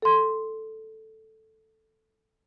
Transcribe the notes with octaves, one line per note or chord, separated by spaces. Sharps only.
A4 C6